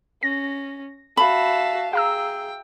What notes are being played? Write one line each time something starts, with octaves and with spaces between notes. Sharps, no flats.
C#4 A#6
F#4 E5 F5 A5 B5
G#4 F5 G5 A#5 E6